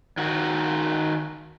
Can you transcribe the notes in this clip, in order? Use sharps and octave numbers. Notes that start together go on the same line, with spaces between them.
D#3 F#4 A#4